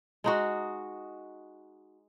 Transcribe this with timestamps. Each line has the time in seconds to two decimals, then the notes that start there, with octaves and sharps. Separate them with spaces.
0.24 G#3 D#4 F#4